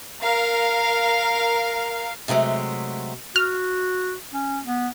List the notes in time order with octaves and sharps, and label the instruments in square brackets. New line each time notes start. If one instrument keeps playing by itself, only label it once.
[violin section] A#4 F5
[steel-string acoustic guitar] C3 F#3 G#3 A3
[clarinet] F#4 [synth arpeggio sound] F6
[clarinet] C#4
B3